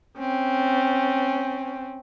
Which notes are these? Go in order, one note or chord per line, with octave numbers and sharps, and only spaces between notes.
C4 C#4